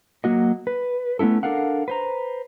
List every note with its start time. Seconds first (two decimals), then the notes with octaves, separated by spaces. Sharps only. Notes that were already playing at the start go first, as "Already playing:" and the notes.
0.24 F#3 A#3 F#4 D#5
0.67 B4
1.19 A3 B3 C#4 E4 A4
1.43 D4 A4 A#4 F5 F#5
1.88 B4 C5 A#5